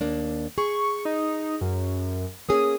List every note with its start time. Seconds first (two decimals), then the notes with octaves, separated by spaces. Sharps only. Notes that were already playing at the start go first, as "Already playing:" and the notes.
0.01 D#2 A#3 D4
0.58 G#4 C#6
1.05 D#4
1.61 F#2
2.49 A#3 C#4 G#4 D#6